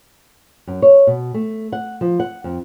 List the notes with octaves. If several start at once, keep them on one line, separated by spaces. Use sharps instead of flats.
F#2
C#5
B2
A3
F#5
F3
F#5
F2